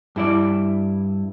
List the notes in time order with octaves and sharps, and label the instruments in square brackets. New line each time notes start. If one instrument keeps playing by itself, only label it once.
[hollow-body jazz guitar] G2 E4 D5